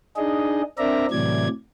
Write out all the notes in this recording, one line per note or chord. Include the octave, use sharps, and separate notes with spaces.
D4 D#4 G#4 D#5
C4 D4 A#4 D5 E5 A#5
A2 C3 E3 F#3 D5 G#6